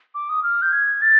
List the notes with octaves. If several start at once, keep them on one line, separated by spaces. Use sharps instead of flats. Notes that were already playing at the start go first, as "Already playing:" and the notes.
D6
D#6
F6
G6
G#6
A6